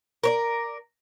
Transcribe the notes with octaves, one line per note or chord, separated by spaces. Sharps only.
A#4 C#5 D5